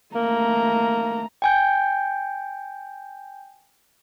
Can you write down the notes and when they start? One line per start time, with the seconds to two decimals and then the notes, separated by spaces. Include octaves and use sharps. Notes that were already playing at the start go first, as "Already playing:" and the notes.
0.15 A3 A#3 A#5
1.42 G5 G#5 G6